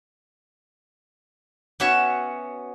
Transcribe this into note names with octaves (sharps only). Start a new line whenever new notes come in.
B3 C#4 F#4 C#5 E5